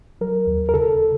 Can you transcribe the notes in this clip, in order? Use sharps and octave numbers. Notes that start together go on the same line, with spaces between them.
F#3 A#4
D#2
A#4
C#3 A4